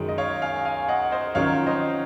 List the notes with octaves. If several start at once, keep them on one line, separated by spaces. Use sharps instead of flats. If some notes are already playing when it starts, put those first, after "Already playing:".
Already playing: F#2 D#3 G#3
D#5
C#5 F5
F5 G#5
F5 G#5
D#5 F#5
C5 D#5
F2 D#3 F#3 C#4 C#5 F5
C5 D#5